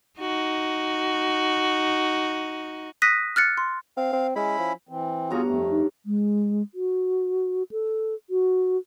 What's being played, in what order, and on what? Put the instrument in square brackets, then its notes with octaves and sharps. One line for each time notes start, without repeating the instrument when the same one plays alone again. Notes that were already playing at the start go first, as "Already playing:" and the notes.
[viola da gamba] D#4 F#4
[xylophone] D#6 F#6 A#6 B6 D#7
F6 F#6 A6 C#7
C6
[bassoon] C4 [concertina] F5
[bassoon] C4
[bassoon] G#3 [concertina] C#4 E4 B5
[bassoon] F3
[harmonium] E3 C4
[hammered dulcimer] G2 C#5 A#5 [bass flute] B3 [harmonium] F4 F#4 G#4
[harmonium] F2 A3
[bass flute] D#4
G#3
F#4
A4
F#4